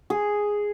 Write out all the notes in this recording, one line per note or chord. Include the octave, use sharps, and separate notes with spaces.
G#4